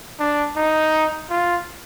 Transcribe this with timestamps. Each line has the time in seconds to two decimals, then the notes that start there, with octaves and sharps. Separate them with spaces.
0.19 D4
0.56 D#4
1.30 F4